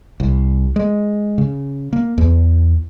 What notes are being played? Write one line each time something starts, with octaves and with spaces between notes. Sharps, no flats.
C2
G#3
C#3
A#3
E2